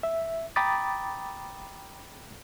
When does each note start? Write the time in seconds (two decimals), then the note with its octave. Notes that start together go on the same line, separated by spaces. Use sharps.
0.03 E5
0.56 G5 A#5 B5 D6 D#6 A6